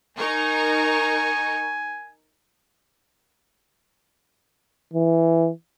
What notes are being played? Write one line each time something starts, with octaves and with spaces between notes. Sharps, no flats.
D#4 A#4 G#5 C#6
E3